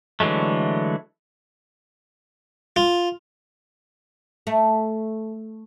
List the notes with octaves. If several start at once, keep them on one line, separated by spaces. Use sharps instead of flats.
D3 E3 F#3 G#3 A3
F4
A3